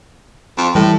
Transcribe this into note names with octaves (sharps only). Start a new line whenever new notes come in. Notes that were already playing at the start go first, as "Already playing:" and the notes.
F2
A2 E3 G3 A3